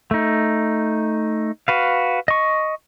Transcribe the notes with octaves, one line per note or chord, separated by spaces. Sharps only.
A3 D#4
F#4 B4 F5
D#5 C#6